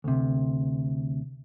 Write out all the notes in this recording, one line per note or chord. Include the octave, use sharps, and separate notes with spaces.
D2 C3